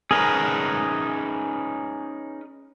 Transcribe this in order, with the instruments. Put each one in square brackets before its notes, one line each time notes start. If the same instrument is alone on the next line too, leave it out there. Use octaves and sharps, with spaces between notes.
[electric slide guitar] C#4 D#4 B4 [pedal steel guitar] G#4 A#4